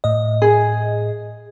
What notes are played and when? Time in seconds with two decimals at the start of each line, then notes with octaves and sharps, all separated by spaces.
0.04 A2 D#5
0.42 G#4